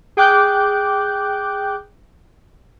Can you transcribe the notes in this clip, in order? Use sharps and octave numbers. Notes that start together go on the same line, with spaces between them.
G#4 G5 D6 F#6 G6